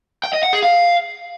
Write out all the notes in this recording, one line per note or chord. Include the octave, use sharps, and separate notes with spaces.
G5
D#5
F#5
G#4
F5